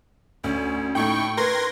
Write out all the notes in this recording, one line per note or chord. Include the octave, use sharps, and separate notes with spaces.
D2 C#4
A2 A3 D#4 G5 C#6
A#4 B4 C6 G#6 A#6